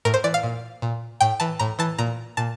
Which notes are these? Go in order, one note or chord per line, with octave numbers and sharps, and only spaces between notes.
A2 A#4
C5
E3 D5
F5
A#2
A#2
A2 G5
E3 A5
A2 A#5
E3 A5
A#2 A#5
A#2 A5